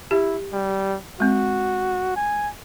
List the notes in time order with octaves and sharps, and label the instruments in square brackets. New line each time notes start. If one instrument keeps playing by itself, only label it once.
[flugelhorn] E4 [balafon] G4
[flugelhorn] G3
[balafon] G#3 C4 [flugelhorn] F#4
[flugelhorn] G#5